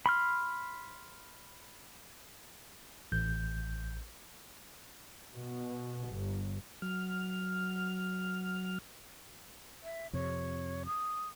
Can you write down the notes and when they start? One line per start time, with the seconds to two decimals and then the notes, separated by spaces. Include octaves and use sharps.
0.06 B5 C6 F6
3.12 A1 G6
5.36 B2
6.10 G1
6.82 F#3 F6
9.83 E5
10.13 F2 C3 C#5
10.86 D#6